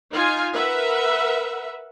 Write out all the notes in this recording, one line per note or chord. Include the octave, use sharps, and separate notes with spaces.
D#4 F4 G#5
A#4 B4 E5 F#5